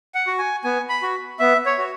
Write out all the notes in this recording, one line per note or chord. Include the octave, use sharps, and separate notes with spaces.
F#5
F#4
G#5
B3 G#5
B5
F#4
B3 E5
C#5
F#4